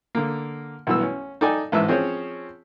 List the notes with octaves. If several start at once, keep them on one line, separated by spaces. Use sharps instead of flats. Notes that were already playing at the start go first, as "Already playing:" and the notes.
D3 A#3
B1 G2 E3 B3 E6
C#4
D#4 A4 D5 G5 G#5
A1 G#2 B4 E5 E6
F3 C4 C#4 G#4 C5 C#5